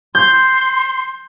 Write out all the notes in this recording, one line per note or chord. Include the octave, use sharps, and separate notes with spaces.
C6 G6